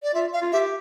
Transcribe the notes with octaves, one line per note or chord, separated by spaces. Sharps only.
D5
F4 E5
F5
F4
G4 E5